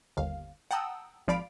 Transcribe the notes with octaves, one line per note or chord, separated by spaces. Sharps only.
G1 D#2 F5
F#5 G5 A5 A#5 D#6 E6
G#1 F3 D5 F5 B5 D7